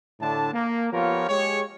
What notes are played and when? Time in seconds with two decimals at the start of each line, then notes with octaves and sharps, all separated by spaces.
0.20 A2 D3 A3 D4 A5
0.53 A#3
0.92 F3 B3 F4 G4 A#4 C#5
1.29 G#3 G4 G#4 C#5